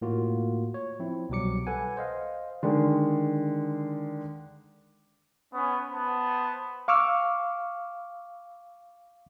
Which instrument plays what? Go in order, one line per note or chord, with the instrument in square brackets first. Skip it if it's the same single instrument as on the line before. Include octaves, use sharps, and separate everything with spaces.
[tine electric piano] A2 A#3 F4 F#4
C#5
F3 C4 E4
C2 B2 F#3 G3 D6 C#7
A4 B4 F#5 G#5
C5 D#5 F5
[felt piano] D3 D#3 G#3
[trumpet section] B3 C#4
B3 C5 A5
[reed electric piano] F5 C#6 D6 E6 F6